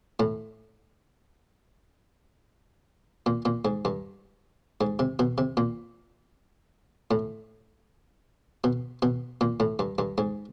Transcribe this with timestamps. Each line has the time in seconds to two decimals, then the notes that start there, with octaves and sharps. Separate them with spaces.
0.20 A2
3.26 A#2
3.45 A#2
3.65 G#2
3.85 G2
4.81 G#2
4.99 C3
5.19 B2
5.38 C3
5.57 A#2
7.11 A2
8.64 B2
9.02 B2
9.41 A#2
9.60 A2
9.79 G2
9.98 G2
10.18 G#2